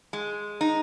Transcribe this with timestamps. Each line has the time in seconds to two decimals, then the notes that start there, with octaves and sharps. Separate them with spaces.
0.13 G#3
0.61 D#4